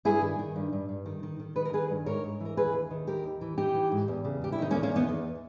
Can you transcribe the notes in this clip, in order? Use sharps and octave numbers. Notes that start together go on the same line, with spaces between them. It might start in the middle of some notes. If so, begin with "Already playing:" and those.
G2 E4 G#4
D#3
D#3
G2
G2
G2
D#3
D#3
D#3
D#3 B4
A#4
D#3 G#4 B4
G2
G#2 A#4 C#5
G#2
E3 A#4
D#2 G#4 B4
D#2
D#3
D#2 G4 A#4
D#2
E3
E3 D#4 G4
E3
G#2
E2
C#3
E2 G4
E4
D#3 D#4
A#3 C#4
E2
A#3 C#4
D#3 B3 D#4
E2